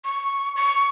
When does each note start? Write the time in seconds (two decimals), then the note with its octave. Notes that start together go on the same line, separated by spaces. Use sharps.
0.04 C#6
0.56 C#6